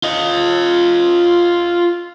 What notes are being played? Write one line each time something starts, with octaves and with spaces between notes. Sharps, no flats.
F4 D#5